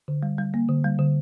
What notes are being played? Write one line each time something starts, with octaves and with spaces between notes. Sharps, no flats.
D3
G3
G3
A#3
D3
G3
D3